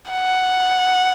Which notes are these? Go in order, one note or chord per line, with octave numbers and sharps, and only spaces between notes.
F#5